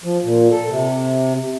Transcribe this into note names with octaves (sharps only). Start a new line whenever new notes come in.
F3
A#2
A4
C3